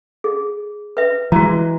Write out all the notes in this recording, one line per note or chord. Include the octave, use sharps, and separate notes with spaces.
G#4
B4 E5
E3 G#3 F#4 A#5